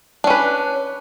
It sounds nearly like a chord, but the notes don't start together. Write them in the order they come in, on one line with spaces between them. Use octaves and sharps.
D4 C#4 B4